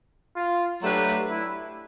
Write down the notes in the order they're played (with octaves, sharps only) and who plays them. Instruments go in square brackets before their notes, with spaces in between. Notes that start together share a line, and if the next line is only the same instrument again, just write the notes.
[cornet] F4
[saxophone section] F#3 A3 D4 G4 B4
[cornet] E4